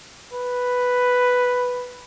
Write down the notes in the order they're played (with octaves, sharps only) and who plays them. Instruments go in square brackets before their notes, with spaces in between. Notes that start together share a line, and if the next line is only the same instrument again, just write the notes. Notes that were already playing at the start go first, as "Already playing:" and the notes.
[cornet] B4